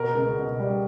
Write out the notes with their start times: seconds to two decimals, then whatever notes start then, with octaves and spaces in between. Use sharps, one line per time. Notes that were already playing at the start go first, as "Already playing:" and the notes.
Already playing: B2 A#4
0.15 C#2
0.37 B2
0.59 G3